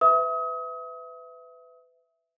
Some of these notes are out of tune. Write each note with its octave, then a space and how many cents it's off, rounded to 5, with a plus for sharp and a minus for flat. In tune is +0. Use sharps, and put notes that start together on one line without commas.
B4 +25 E5 +0 D#6 +35